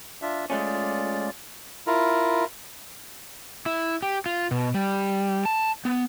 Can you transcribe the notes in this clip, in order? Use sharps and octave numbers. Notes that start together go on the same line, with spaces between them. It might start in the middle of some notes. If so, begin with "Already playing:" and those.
D4 F4 E5
G#3 A3 C#4 F4 D5
E4 F4 A#4
E4
G4
F4
B2
G3
A5
B3